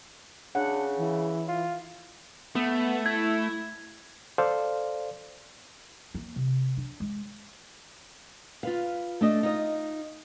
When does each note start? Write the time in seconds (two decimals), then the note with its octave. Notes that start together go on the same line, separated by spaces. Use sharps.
0.55 C#3 D4 F#5
0.97 E3
1.48 F4
2.55 A3 B3
3.06 E4 G#6
4.38 A4 C5 D5 F5
6.15 A#3
6.36 C3
6.77 D4
7.00 G#3
8.63 F4 B4 F5
9.21 A3 D4 D#5
9.43 D#4 F4 D#5